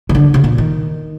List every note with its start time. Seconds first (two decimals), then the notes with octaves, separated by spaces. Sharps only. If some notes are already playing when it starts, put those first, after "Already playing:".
0.09 D#3
0.15 D3
0.34 C3
0.44 A#2
0.58 D#3